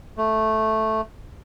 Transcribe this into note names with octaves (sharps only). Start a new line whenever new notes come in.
A3